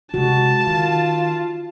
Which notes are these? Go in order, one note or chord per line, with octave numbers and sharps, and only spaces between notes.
C3 G#3 F#4 A5
D#3 F4